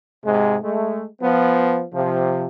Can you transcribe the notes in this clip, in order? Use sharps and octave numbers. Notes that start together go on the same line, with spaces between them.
G#2 C3 G#3
G#3 A3
F3 B3
C3 F3